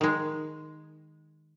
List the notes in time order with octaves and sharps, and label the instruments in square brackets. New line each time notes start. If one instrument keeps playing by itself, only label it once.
[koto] D#3 G#3